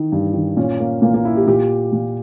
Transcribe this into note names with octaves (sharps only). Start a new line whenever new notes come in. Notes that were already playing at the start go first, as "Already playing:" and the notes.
Already playing: D#3 D#4
G2
D#3
A#2 C#4
A#3
A#2 A#3
A#3
E4
G4
A#2 G4
A#2